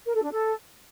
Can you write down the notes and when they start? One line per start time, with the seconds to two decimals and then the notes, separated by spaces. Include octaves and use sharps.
0.06 A#4
0.15 A4
0.23 D4
0.32 A4